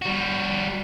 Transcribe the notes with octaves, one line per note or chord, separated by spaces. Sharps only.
G3 F#4